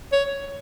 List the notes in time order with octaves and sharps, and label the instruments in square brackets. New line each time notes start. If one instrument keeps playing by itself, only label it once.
[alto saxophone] C#5